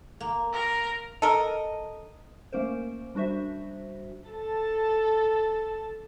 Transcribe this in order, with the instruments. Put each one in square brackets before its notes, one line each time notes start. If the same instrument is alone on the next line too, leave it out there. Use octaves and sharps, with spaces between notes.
[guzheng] A#3
[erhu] A#4
[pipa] A4 A#4 [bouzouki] D#5
[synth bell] A3 A#3 C#4 A#4 C5
G3 D4 F#4 C5 E5
[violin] A4 A5